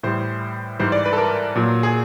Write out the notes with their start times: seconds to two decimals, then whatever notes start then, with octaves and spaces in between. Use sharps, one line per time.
0.03 A2 E3 G3 C5
0.79 G#2 E3 G3 C5
0.92 D5
1.06 B4
1.13 A4
1.18 A#4
1.55 A#2 F#3
1.83 G#4